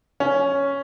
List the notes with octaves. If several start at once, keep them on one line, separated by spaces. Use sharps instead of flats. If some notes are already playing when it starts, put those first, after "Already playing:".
C#4